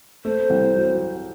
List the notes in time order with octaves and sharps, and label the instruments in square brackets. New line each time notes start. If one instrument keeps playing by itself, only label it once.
[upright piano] A3 [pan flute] C5
[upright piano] C2
F#3